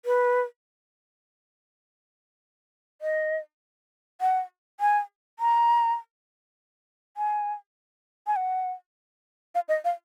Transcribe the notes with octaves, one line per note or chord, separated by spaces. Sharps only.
B4
D#5
F#5
G#5
A#5
G#5
G#5
F#5
F5
D#5
F5